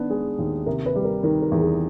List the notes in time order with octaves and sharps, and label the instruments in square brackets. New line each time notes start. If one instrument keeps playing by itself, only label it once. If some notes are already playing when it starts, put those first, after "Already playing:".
Already playing: [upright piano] D#3 B3 [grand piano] D4
[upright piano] G#3 [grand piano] G#4
[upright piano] D#2
[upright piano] C3 [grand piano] A#4
[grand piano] B4
[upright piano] G3
[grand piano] A#4
[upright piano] D#3 [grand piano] A#4
[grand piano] A#4
[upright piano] E2
[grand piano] G#4